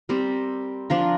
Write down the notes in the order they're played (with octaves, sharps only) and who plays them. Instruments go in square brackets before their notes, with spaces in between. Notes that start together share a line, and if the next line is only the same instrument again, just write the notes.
[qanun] G3 C4 A#4
F3 D4 F4 A#4